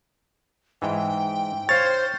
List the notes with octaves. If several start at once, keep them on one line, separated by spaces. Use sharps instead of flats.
G#2 E3 G5
C5 C#5 F5 A6